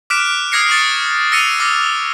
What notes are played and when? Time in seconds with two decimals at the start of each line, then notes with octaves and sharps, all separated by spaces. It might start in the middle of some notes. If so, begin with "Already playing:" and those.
0.10 D6 F6 F#6 B6 D7 E7
0.52 D#6 F6 G#6 A#6 C7 C#7
0.69 C#6 D#6 A6 C#7
1.32 E6 A#6 C#7 D#7 F7
1.60 D6 F6 A#6